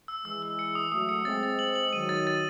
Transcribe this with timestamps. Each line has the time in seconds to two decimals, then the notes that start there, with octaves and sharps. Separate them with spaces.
0.08 E6
0.24 E3 G#3 E6
0.42 E6
0.59 C#7
0.75 D#6
0.92 F#3 A3 D#6
1.09 C#7
1.25 G#3 C4 A6
1.43 A6
1.59 F#7
1.76 F#7
1.93 D#3 F#3 D#7
2.09 A6
2.27 A6